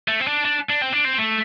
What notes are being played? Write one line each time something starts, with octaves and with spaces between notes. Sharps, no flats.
A3
C4
D4
D4
D4
C4
D4
C4
A3